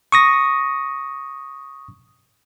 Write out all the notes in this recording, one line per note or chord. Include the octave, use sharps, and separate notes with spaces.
C#6 D#6 A#6